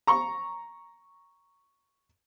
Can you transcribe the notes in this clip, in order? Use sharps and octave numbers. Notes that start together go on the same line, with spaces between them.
A#5 C#6